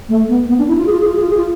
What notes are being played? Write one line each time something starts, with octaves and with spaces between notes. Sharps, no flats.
A3
B3
B3
D4
E4
F4
G#4
F4
G#4
F4
G#4
F4
G#4
F4